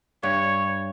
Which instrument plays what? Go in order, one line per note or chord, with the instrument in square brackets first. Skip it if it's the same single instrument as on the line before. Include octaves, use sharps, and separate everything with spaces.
[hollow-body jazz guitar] G2 [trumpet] C#5